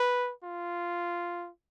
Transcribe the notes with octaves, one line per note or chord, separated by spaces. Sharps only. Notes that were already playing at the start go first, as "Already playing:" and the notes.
Already playing: B4
F4